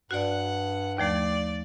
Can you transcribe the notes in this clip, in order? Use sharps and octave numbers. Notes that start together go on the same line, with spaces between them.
G2 F#4 D5 F#5
D#2 F3 A3 D5